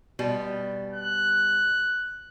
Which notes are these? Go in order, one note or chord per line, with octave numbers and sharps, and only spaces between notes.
B2 G3
F#6